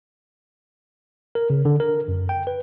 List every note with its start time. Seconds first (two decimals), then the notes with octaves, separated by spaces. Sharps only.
1.35 A#4
1.50 C#3
1.65 D3
1.80 A#4
2.08 F#2
2.29 G5
2.47 B4